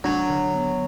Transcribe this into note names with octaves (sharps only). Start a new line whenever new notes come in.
F#3 D4
D3
B3